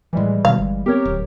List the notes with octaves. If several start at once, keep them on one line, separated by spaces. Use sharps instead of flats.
A2 E3 F3 G3 G#3
B2 D#3 F5
G1
B3 C4 G4 A#4 C#5
D1